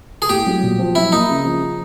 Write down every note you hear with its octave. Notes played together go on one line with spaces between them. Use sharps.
G#4
A2 G4
F#3
A#2
F3
F#3 E4
A#3 D#4
C#3
F3